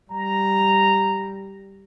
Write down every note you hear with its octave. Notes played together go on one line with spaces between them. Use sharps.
G3 A#5